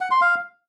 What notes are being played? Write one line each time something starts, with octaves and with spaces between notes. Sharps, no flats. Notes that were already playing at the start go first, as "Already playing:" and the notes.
F#5
C6
F5